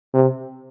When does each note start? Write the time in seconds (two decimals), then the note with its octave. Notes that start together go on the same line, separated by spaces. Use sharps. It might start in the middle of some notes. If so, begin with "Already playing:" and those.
0.14 C3